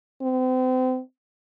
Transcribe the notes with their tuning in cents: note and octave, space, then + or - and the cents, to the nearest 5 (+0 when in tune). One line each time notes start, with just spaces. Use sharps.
C4 -35